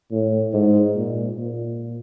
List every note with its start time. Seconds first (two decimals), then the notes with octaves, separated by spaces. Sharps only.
0.11 A2
0.53 G#2
0.96 A#2
1.38 A#2